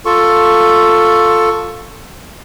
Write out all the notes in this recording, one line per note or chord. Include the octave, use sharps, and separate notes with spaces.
F4 A4 C#6